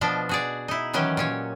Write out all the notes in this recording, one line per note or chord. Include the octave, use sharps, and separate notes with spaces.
B2 F3 D4 D#5
F#4 G#4 D5
D#4 E4
D#3 E3 F#3 C#4 G4
A#2 C#4 C#5